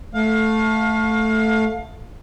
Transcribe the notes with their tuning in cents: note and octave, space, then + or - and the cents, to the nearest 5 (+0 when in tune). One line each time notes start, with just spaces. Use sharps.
A3 +0 F5 +25